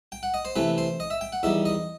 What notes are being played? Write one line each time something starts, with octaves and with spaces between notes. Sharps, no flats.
G5
F#5
D#5
C5
C3 E3 A3 B4
C5
D#5
E5
G5
F#5
E2 D#3 G3 E5
D#5